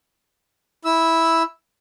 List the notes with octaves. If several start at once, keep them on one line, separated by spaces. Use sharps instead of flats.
E4 E6